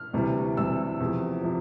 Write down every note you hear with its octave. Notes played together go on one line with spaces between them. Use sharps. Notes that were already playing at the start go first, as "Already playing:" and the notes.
Already playing: F6
D2 C3 E3 G3
D2 C3 E3 G3 E6
E2 C3 F3
C3 F3